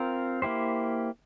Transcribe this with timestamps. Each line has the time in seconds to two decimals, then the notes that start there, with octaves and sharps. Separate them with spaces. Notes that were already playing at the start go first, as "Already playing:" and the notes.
Already playing: C4 F4 A#4
0.42 A#3 E4 G4 C5